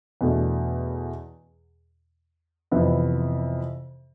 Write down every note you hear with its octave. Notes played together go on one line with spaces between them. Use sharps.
E2 B2 A3 D4
F2 C3 E3 B3